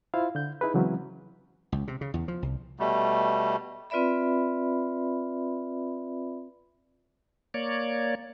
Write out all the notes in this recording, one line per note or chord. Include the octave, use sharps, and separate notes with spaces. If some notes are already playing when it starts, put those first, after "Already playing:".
E4 F4 C5 F5
D3 G6
D#4 E4 G#4 B4
C#3 E3 F#3 G#3 C4 C#4
C#2
C3
C#3
E2
F3
C2
B2 G3 A3
C4 F4 B4 D5 E5 B5
A#3 C#5 D5